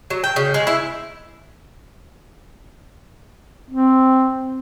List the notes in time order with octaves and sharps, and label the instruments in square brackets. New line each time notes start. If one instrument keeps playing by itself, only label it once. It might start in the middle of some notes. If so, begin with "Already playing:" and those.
[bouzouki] F#3
G5
C#3
G#3
E4
[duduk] C4